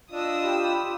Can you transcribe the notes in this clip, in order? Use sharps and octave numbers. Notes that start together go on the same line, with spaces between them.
D4 F4 D#5 D#6 E6
G4 B5